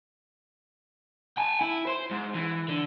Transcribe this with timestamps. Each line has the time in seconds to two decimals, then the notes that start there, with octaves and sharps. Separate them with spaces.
1.37 G5 G#5
1.61 E4
1.87 C5
2.11 G#2
2.34 E3
2.68 D3